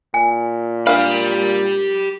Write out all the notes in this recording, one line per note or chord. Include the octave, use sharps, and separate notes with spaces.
A#2 G#5
D4 G4 A#4 F5 B5